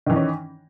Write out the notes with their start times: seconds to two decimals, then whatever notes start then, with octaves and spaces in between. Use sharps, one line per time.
0.06 D#3
0.10 E3
0.13 D#4
0.16 C#4